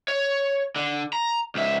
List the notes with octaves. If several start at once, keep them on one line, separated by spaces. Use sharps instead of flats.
C#5
D3
A#5
C#2 E5